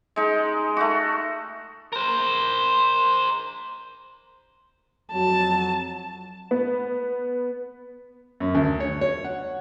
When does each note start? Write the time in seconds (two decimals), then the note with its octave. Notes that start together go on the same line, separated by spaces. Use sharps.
0.16 G#3 D#4
0.77 A3 F#4
1.93 A#4 C5
5.13 F2 F#3 A5
6.51 B3
8.40 F#2
8.55 D2
8.80 C#5
9.01 C#5
9.25 F#5